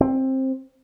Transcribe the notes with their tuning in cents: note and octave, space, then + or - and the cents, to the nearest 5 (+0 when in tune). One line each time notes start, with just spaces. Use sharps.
C4 +15